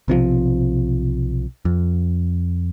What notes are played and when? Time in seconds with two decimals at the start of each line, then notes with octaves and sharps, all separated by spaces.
0.08 B1 C3 E3 F3
1.65 F2